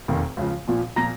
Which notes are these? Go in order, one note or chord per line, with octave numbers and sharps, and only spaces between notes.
F1 D#2 D#3
C#2 C#3 F3
A#1 A#2 F3
A#2 F3 A#5 A#6